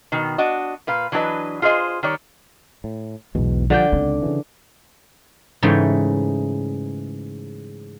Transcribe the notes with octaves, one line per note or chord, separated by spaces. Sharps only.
B2 D#3
D4 F#4 D#5
A#2 B4 F5
E3 F#3 D4 G4 B4 D#5
F4 G#4 C5 D#5
D#3 G3 C#5 D5
A2
B1 E2 G#2 B2
D3 F3 G3 D4 G5
C#2 C4 D#4
C#3 E3
G#2 C#3 E3 G#3 A3 G5